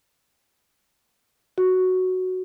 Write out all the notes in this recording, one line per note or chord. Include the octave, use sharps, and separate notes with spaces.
F#4